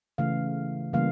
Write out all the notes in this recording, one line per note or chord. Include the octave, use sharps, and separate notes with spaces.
C#3 E3 A3 F5
C#3 E3 G3 A#3 F5